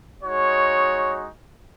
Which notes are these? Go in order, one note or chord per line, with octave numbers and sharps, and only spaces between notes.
G#3 D#4 F#4 C#5